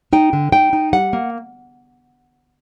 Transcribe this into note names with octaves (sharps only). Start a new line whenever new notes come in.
D#4 G5
D3
D#4 G5
D#4
G3 F#5
A#3